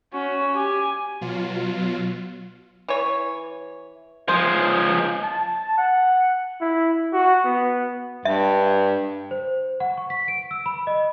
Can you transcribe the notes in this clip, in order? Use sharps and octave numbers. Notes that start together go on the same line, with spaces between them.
C#4 F#4
G4 G#5
B2 F#3 F4
E3 C#5
F3 G#3 C5
A5
F#5
E4
F#4
B3
G2 E5
C5
F#5
C#6
B6
D7
E6
B5
D#5